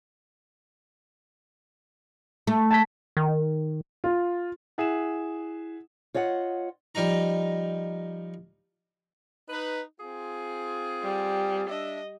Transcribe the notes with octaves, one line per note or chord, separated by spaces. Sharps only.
A3
A5 G#6 B6
D#3
F4
E4 G#4 E5 F#5 E7
F4 C#5 D#5 F#5
F3 G3 D#4 A#5
D#4 B4
C4 F4 G#4
G3
D4 D#5 E5